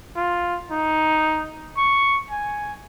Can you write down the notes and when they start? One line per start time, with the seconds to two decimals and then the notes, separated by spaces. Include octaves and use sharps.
0.16 F4
0.71 D#4
1.77 C#6
2.30 G#5